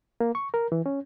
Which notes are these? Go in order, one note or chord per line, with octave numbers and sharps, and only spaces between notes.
A#3
C#6
A#4
E3
C#4